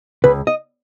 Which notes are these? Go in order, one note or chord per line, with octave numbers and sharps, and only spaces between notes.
C#2 B4
D#5